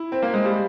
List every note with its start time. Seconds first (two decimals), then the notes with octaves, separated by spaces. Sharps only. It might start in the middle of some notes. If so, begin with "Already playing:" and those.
Already playing: E4
0.12 C4
0.22 A#3
0.34 G#3
0.45 G3